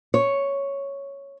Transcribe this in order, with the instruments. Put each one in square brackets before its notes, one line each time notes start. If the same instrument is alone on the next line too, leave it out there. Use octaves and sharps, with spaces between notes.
[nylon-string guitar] C#5